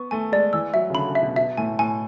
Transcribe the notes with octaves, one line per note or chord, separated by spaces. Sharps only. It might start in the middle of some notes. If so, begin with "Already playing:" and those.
Already playing: B3 C#6
A3 G#5
G#3 D5
E3 E6
F#3 E5
C#3
D3 B5
C#3
E5
B2
B2 E5
A2 G#5
A2 G#5